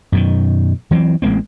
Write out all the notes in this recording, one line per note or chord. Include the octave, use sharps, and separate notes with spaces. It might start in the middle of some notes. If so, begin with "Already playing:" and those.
F#2 B2 D#3
E3 F#3 A#3 C4
A1 G#3 A#3 C4